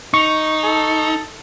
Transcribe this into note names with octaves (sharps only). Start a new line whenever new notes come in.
D#4 C#6
A4